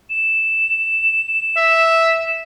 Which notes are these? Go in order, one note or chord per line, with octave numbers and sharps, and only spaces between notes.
E7
E5